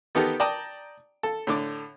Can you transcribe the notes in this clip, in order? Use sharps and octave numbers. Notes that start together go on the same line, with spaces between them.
D#3 B3 D#4 G4 A4
D5 G5 A5 A#5 D6 D#6
A4
A2 D3 D6